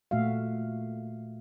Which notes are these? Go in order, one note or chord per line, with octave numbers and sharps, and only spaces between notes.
A#2 A3 F#4 E5 F5